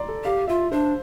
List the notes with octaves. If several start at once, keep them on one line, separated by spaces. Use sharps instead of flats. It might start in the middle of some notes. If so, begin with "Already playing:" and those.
Already playing: D5 A#5 C6
A4
G4 F5
F4 E5
D4 C5